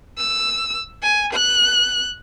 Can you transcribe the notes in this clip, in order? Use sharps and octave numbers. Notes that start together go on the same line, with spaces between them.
E6
G#5
F#6